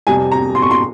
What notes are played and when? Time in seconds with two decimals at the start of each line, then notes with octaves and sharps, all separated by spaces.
0.07 F2 C3 G3 G#5
0.32 A#5
0.55 C6
0.62 C#6
0.71 C6